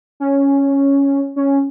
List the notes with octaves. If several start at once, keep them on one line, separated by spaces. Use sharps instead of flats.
C#4
C#4